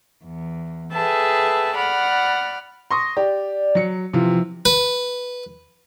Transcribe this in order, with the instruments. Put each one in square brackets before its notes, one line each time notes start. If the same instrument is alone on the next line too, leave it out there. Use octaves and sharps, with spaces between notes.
[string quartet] E2
G#4 A4 B4 E5 G5 A5
D5 F#5 B5 F6
[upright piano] C6 C#6 D#6 [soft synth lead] A#6
[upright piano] G4 [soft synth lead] D5
[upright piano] F#3 C#7
[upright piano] C3 E3 F4 [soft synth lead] F3
[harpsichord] B4